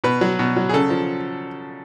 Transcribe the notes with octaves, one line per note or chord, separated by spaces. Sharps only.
B2 B4
F#3
B2
F#3
G#4
C#3 A4
F3